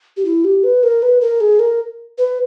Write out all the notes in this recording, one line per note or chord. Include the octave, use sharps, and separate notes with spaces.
G4
E4
G4
B4
A#4
B4
A#4
G#4
A#4
B4